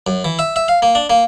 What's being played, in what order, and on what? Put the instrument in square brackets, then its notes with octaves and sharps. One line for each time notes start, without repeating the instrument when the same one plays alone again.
[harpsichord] F#2
E3
E5
E5
F5
A#3
D4
A#3